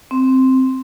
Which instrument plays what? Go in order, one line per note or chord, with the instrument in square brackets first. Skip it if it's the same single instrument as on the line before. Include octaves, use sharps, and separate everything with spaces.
[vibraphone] C4